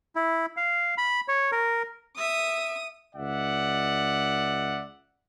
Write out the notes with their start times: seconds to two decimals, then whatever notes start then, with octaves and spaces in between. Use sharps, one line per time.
0.16 E4
0.57 F5
0.98 B5
1.28 C#5
1.52 A#4
2.18 E5 D#6
3.15 C#2 D5 E5 F#5